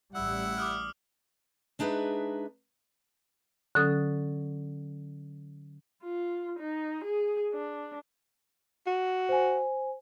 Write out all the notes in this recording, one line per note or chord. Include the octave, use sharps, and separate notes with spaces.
A1 G3 E4 F#5 E6
D6 D#6 F6
G#3 D4 D#4 G#4 B4 E5
D3 F#3 C#4 A4 D#6
F4
D#4
G#4
D4
F#4
C5 G#5